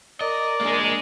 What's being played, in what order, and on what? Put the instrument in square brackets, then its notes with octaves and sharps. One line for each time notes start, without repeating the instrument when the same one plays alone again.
[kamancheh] A#4 [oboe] D5 [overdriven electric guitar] D#5
[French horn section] G#3 [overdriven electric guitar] A#3 D4